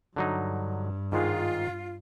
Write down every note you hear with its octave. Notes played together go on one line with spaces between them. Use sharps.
G2 D3 F#3 D#4
G#2 D#3 G#3 F4